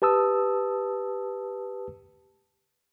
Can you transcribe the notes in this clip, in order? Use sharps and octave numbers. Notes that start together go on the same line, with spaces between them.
G4 B4 A5 D#6 E6